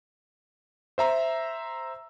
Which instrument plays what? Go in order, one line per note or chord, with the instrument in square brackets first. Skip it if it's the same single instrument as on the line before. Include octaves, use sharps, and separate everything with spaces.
[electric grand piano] C5 E5 A#5 E6